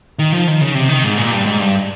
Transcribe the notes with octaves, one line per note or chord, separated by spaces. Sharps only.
D#3
F3
D#3
C#3
C3
D#3
G#2
A#2
G2
G#2
G2